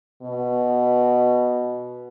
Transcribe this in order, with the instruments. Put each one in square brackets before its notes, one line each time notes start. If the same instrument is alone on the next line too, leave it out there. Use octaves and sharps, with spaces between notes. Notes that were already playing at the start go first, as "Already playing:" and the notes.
[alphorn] B2